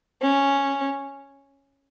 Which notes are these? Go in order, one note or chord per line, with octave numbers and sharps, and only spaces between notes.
C#4